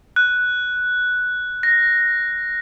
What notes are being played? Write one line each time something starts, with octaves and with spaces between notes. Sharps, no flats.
F#6
A#6